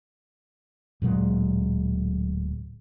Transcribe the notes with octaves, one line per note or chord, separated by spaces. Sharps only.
D1 A#2 F#3 G#3